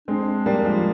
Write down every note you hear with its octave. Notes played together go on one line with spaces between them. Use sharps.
G#3 C4 D4
G3 A#3
F3 G#3